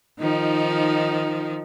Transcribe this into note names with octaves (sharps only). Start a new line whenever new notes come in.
D#3 F3 D#4